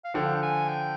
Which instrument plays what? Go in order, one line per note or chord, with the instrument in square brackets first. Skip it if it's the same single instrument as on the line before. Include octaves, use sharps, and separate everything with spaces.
[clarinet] F5
[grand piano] D3 F3 [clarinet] G5
[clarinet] G5
G#5
G5